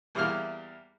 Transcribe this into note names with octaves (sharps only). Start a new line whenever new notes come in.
E2 G3 A#3 E4 F6